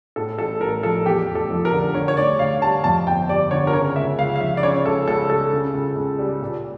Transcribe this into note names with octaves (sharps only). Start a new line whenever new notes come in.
A2 A4
A1 A4
A1 A#4
F3 A4
E2 G4
F1
A4
F3
A#4
D3
D3 C#5
C#5
D2 D5
D2 F5
G3 A5
F2 A5
G1 G5
G3 D5
D3 C#5
A#4
C#3 C#5
C#2 E5
C#2 F5
F5
F3 E5
D5
C#3 C#5
C#2 A4
C#2 A4
G3 A4
C#3
C#2
C#2
G3
A#2